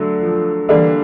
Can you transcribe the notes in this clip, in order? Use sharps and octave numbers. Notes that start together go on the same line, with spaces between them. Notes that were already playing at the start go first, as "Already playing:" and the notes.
Already playing: D3 F#3 A3
F3
D3 E3 G3 A#3 D4